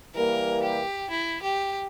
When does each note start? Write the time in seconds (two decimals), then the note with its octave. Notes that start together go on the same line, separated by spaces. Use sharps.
0.15 E3 G3 A#3 A#4
0.63 G4
1.10 E4
1.42 G4